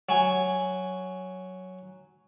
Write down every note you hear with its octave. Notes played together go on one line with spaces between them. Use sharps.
F#3 G#5